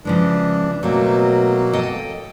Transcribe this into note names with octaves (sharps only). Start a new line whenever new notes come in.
C#3 E3 F3 G#3 D4
B2 F#3 A3 A#3 C4
A4 D#5 G5